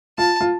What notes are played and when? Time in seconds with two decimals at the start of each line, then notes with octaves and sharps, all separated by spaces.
0.18 F4 A5
0.41 F4